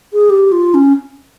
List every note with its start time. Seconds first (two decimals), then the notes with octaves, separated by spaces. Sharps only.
0.13 G#4
0.30 G4
0.52 F4
0.74 C#4